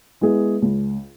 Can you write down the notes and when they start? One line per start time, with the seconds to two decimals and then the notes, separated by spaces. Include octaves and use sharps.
0.21 G#3 B3 E4 G#4
0.62 C#2